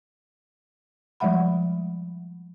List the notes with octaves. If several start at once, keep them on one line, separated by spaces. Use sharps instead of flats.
F3 G3 G#3 E5 F#5 B5